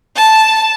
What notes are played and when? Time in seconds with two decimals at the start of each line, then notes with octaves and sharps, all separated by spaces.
0.16 A5